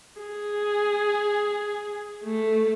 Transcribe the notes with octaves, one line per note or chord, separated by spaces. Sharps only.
G#4
A3